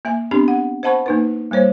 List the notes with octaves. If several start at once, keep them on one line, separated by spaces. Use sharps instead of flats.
A#3 E5 G#5
B3 C4 D4 G4 B5
F#5
C5 D#5 F#5 A5 B5 C#6
A#3 D#4 B4
G3 A#3 C5 C#5